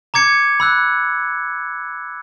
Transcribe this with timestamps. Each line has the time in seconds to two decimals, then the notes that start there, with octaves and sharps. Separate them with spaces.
0.14 A#5 D6 G#6 C#7
0.60 B5 E6 F#6